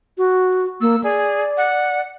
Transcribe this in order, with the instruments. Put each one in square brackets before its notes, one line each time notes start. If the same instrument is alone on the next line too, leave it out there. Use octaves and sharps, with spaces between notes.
[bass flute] F#4
[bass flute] A#3 [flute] E6
[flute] G#4 [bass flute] D5
[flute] F#5